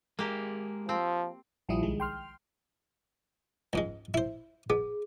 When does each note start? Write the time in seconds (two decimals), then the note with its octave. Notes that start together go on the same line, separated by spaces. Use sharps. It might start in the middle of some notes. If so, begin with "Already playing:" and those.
0.19 G#3 A#3 G4 G#4 A#4
0.89 F3 C4
1.69 A#1 F3 G3 E4 D#6
1.82 C2 D#3 G#3
2.00 G5 C6 F6
3.73 C#2 G#2 G#3
4.14 E4 C5
4.70 B3 G#4